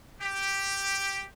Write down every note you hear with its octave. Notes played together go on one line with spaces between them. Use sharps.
G4